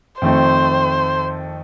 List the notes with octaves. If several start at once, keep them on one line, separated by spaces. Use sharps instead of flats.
F2 D#3 A3 C4 C5